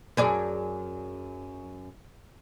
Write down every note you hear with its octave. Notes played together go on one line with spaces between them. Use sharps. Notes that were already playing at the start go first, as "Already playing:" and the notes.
F#2 G#4 D5